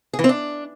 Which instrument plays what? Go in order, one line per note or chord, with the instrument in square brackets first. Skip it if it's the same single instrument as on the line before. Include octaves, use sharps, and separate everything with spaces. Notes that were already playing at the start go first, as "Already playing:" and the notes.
[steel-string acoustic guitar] G#4
E3
C4
D4